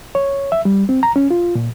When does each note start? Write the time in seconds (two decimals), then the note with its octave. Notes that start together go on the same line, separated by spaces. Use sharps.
0.15 C#5
0.52 E5
0.65 G3
0.89 C4
1.03 A#5
1.16 C#4
1.31 F4
1.55 A#2